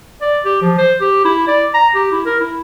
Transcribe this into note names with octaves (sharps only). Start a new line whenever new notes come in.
D5
G4
F3
C5
G4
E4
D5
A#5
G4
E4
A#4
E4